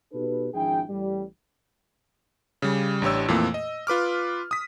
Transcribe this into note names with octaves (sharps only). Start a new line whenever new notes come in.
B2 D#4 G4 A4 B4
G#1 F3 D4 E4 G#4 G5
A1 G3
C#3 G3
A1 D4 G4 C#5 E6
F2 A#2 E3 A3 A#3
D#5
F4 B4 D6 F6
D#6 B6